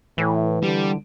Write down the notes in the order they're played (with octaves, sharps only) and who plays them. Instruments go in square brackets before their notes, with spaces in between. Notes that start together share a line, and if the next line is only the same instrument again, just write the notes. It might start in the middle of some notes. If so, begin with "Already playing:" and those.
[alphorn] A2 [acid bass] E3
[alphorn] D3 [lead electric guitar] G3